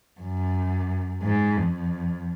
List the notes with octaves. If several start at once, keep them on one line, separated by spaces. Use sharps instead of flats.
F#2
G#2
F2